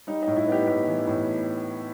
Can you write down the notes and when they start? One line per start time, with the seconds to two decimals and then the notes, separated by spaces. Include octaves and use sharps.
0.07 G3 D#4
0.23 A2 D#4
0.36 E4
0.47 B3 G4
0.67 A2 G4
0.87 E3
1.07 A2